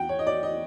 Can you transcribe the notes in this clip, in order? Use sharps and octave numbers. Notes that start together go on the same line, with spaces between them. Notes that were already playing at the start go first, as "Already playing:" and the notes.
Already playing: E2 F#5 G5
C#5
D#5
D5
D#5